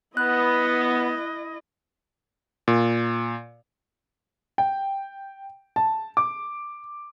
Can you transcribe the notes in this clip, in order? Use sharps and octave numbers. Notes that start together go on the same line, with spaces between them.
B3 E4 D#5 F#6
A#2
G5
A5
D6